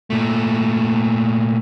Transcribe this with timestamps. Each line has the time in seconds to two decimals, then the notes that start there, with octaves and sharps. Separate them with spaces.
0.10 A#2 A3